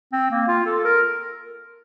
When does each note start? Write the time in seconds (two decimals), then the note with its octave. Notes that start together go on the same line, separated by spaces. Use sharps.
0.12 C4
0.31 A#3
0.48 F4
0.66 A4
0.85 A#4